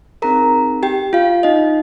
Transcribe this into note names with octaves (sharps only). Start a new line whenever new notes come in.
C4 D#4 G#4 A#4 A#5
G4 G5
F4 F5
D#4 D#5